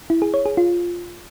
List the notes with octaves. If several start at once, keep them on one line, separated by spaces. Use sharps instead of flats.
E4
G#4
C#5
G#4
F4